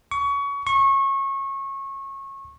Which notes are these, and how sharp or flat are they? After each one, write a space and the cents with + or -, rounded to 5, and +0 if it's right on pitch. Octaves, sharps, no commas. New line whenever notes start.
C#6 +25
C#6 -25